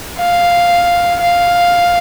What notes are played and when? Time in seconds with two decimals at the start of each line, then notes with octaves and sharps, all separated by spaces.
0.19 F5
1.21 F5